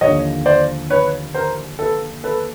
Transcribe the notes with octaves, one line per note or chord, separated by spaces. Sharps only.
D#2 D3 F3 C#5 D#5
C5 D5
B4 C#5
A#4 C5
A4 B4
A4 B4